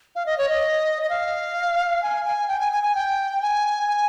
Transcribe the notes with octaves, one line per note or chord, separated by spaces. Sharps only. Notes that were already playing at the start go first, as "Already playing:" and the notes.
F5
D#5
C#5
D#5
D#5
F5
G#5
G#5
G5
G#5
G#5
G#5
G5
G#5
G#5